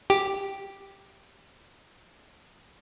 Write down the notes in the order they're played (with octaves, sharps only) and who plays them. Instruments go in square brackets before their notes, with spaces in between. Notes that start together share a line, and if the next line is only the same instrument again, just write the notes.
[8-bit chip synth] G4 G5